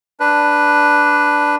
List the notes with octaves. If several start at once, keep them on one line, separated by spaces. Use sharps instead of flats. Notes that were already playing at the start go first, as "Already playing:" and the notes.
D4 B4